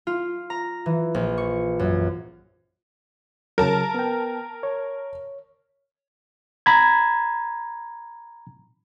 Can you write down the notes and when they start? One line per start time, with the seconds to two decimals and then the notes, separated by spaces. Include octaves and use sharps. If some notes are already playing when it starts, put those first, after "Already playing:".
0.07 F4
0.50 A#5
0.86 E3
1.14 A#1
1.38 C#6
1.79 F#2
3.58 C#3 F#3 A#4 A5
3.95 B3 G5
4.63 C#5
6.66 A#5 B5 G#6